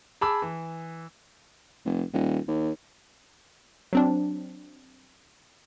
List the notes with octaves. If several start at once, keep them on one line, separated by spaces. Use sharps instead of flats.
G#4 A5 B5 D6 E6
E3
F1
D#1
D#2
F#3 C4 D4